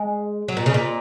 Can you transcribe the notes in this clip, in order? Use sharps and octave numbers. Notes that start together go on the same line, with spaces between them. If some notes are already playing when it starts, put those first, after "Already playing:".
Already playing: G#3
F#3
A#2
C#3
A#2